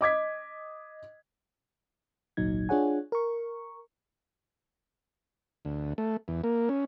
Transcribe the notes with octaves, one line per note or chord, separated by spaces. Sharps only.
D#5 D6 G#6 B6
G#1 C#2 A#2 F#3 D#4 G#6
D4 F4 G#4 C#5 F#5 G#5
A#4 C#6
D2
A3
E2
A#3
C#4